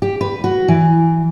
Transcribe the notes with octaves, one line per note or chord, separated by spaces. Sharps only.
G4
B4
F#4
E3